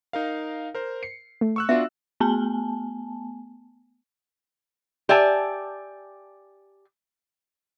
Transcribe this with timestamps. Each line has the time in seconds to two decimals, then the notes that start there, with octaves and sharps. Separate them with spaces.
0.13 D#4 A#4 F5
0.75 A#4 C5
1.03 C7 C#7
1.41 A3
1.56 C#6 E6 F#6
1.69 B3 D4 F4 F#4 E5
2.20 A3 B3 G#5 A5
5.09 G4 D5 E5 G#5 A5